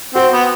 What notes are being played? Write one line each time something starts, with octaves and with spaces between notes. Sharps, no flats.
C4 F#4
B3